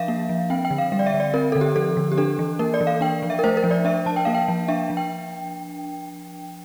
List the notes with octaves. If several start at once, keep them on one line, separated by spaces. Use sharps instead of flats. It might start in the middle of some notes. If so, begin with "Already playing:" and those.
Already playing: F3 D4 E5 F5
A#3
F3
C4 G5
G5
D3
F5
G3 F5
D5
E5
D3
D5
C4 A#4
D3 A4
G4
F3 A4
D3
G4
D4 A4
E3
A#3 A#4
D5
E3
F5
D4 G5
F3
E5
A#4
A3 C5
A#4
F3
D5
D4 E5
F3 A5
G5
A#3 F5
G5
F3
D4 E5
F3
G5